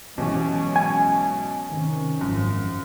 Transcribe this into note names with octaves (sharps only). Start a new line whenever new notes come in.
B2 E3 F#3 G#3 C#4 G4
G#5
C3 D#3 C#4
G#1 F#2 F3